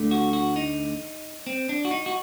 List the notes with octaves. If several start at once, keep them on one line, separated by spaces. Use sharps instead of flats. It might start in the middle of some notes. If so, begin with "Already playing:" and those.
Already playing: D2 D3 A3
F#4
F#4
D#4
C4
D4
F#4
D#4
F#4